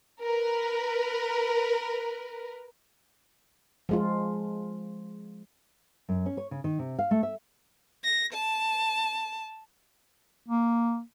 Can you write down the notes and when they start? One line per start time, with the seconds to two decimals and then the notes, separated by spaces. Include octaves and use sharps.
0.22 A#4 B4
3.89 F3 G#3 F4
6.09 F#2
6.26 C#4
6.37 C#5
6.51 C#3
6.64 D#3
6.79 C3
6.99 F5
7.11 A3
7.23 E5
8.04 A#6
8.33 A5
10.47 A#3